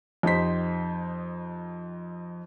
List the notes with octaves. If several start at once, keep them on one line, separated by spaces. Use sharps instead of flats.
F2 D#4 G4 C5 B6